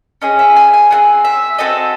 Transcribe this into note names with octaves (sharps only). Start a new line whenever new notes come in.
C#4 G#4 D#5
E5
G#5
G#5
C4 E4 G#4 F#5
E5
C4 F#4 A4 D#5